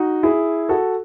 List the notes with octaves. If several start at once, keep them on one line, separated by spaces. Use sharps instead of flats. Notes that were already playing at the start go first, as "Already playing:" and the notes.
Already playing: D#4 F#4
E4 G#4
F#4 A4